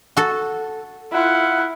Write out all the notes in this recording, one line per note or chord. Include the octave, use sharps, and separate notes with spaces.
F#4 A4
E4 F4 F#5